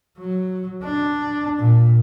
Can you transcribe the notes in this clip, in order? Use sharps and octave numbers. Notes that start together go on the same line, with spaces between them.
F#3
D4
A#2